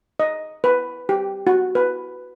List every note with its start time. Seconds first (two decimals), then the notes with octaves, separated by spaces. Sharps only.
0.20 D#5
0.64 B4
1.09 G4
1.47 F#4
1.75 B4